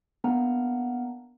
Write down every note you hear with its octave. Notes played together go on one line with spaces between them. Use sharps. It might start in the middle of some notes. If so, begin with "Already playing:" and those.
A#3 B3 D4 A#4 F#5 A#5